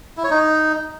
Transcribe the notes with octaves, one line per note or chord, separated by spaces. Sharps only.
E4
C#5
D#4